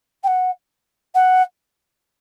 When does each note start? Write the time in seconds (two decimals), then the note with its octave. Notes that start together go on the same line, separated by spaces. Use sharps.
0.23 G5
0.27 F#5
1.14 F#5